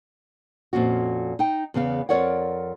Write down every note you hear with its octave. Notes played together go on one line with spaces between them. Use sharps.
F2 A#2 C#4 F#4
D#4 G5
E2 C#3 B3 F5
F2 D#3 A#4 C#5 D5 F#5